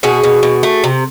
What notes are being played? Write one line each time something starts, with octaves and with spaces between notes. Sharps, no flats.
B2 F#4 G#4
B2
B2
A3
C3